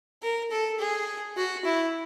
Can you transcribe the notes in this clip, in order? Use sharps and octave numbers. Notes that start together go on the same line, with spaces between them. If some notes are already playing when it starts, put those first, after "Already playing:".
A#4
A4
G#4
F#4
E4